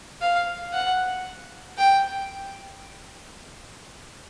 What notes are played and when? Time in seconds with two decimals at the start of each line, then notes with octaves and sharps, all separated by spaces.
0.21 F5
0.73 F#5
1.78 G5